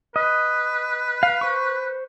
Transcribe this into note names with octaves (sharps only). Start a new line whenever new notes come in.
B4 D#5
F5
C5 C#6